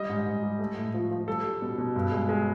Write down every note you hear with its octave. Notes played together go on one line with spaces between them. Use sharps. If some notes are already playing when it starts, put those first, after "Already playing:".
Already playing: G3 D#5
G#2
G#2
G3
A3
A2
F3
F3
G3 A4
G3
B2
B2
G2
G#3
G#3